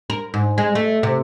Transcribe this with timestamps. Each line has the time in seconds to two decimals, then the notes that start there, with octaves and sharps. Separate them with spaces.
0.10 A#4
0.34 G#2
0.58 G#3
0.75 A3
1.03 C3